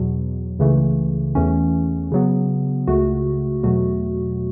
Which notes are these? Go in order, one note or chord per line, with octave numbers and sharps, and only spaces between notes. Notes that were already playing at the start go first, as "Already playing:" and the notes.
Already playing: E2 B2 F#3
C#2 C#3 E3 A3
E2 E3 A3 C#4
C#3 F#3 B3
C#2 C#3 A3 F#4
E2 B2 F#3 A3 F#4